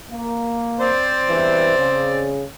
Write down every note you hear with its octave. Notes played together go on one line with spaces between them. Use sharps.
A#3
C4 C5 D5
E2 G2 E3
C#3